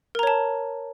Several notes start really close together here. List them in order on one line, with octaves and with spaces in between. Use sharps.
A#4 A#5 C#5 A5